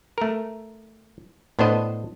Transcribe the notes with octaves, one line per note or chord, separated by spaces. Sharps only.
A3 A#4
A2 B3 D4 C5 D#5